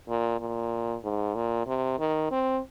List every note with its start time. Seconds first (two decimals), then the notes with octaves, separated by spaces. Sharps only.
0.08 A#2
0.40 A#2
1.04 G#2
1.35 A#2
1.67 C3
1.99 D#3
2.31 C4